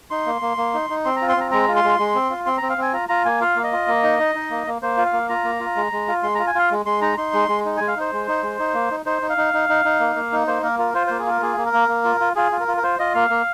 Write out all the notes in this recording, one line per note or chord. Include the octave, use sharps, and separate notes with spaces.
D#4 C6
A#3
A#3
A#3
D#4
D#4
C4 C6
A#5
F4
C6
C4 A#5
G#3 A#5
F4
C6
G#3
G#3
C4
F4
C4 C6
C4 A#5
F5
C4 G#5
F4 A#5
F4 A#5
A#3 G#5
F4 F5
A#3
D#5
F4
A#3
D#4
D#4
D#4
A#3
A#3
A#3 C5
F4
F5
A#3
F4 A#5
A#3
F4
G#3
G#3
F4
G#3 C6
F4 A#5
G#5
F4 F5
G#3
G#3 C6
D#4 A#5
D#4 C6
G#3
G#3
D#4
G#3 G#5
F5
D#4 C5
G#3
D#4
G#3
D#4
A#3
D#4
D#4 C5
D#4
F5
D#4
D#4
D#4
D#4
A#3
A#3
D#4
A#3 C5
A#3 A#4
F4 A#4
F4 C5
A#3 C5
G#4
F4 A#4
A#3 G#4
A#3
A#4
A#3
A#3
F4
F4
F4 G#4
F4
A#4
F4
A#4
F4 C5
F4 D#5
A#3 F5
A#3